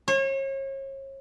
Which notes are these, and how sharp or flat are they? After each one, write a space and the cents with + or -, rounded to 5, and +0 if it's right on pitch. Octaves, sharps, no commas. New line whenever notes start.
C#5 -35